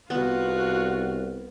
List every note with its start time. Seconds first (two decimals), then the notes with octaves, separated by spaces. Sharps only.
0.10 C2 B3 F4 F#4